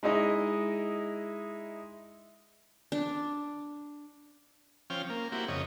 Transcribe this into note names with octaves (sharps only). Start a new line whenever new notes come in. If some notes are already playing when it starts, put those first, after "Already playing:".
G#3 D#4 E4 D#5
D4
F3 C4 C#4 G5 F6
A#3
A#3 C4 E4 F#4 G4
F2 C#3 C#5 D#5